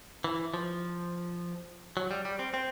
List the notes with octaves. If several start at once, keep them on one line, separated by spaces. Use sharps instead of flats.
E3
F3
F#3
G3
G3
C4
C4